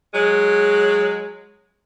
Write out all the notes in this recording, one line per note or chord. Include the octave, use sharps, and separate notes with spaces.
F#3 G#3